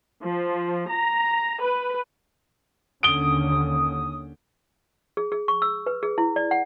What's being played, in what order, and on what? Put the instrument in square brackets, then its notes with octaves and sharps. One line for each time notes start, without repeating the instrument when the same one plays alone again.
[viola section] F3
A#5
B4
[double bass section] D#2 D3 C#4 [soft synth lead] D#6 [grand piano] D7 G7
[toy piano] G#4
G#4
C#6
E6
B4
G#4
E4
D5
F#5